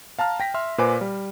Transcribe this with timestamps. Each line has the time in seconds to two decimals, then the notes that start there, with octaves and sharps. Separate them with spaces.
0.19 F5 A5 A#5 F6
0.40 G5 A#6 B6
0.54 E5 C6 F6
0.78 A#2 B4 C5 G#5 D6
1.01 G3